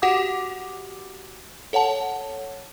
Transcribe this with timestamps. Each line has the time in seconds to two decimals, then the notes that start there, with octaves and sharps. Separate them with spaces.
0.02 F#4 G4 F#5 D6 D#6
1.73 A4 C#5 F#5 A5